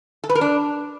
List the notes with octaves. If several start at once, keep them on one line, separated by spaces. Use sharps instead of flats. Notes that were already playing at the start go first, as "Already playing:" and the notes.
A4
B4
A#4
D4